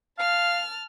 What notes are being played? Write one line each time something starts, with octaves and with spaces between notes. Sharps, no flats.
F5 A5 F6